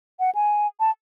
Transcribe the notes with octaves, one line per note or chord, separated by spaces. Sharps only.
F#5
G#5
A5